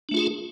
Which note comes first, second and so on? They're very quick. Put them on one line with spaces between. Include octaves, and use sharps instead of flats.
D4 A3 F4 G#4